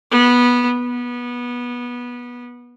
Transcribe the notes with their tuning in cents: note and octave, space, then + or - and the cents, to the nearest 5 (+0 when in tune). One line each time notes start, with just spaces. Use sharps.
B3 -15
B3 -20